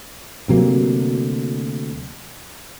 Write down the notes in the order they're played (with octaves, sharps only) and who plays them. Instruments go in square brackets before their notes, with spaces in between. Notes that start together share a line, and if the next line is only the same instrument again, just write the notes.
[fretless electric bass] D2 C3 F#3 A#3